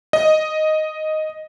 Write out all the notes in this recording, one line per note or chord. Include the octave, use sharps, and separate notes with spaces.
D#5